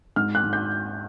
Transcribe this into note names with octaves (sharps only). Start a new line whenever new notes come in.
G#2 F6
F#6
G#2
G6